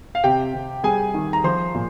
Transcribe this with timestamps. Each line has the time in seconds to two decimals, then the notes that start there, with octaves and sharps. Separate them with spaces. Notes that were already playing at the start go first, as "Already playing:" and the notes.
0.15 F5
0.24 C3 G4 G5
0.54 C3
0.84 G3 G#4 G#5
1.14 D#3
1.33 A#5
1.44 F3 C5 C6
1.74 A#2